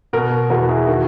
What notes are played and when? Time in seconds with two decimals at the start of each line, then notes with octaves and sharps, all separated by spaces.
0.13 B2 F#4 A#4
0.50 E2 F#4 A#4
0.68 E4 G#4
0.87 D#3 F#4 A#4